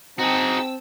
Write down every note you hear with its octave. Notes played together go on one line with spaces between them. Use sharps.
C4 D#4 F#4 G#4 G5 A5 E6